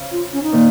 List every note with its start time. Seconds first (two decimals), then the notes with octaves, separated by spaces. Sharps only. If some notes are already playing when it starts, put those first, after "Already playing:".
Already playing: C#3
0.12 F4
0.33 C#4
0.43 D#4
0.52 A#2 D#3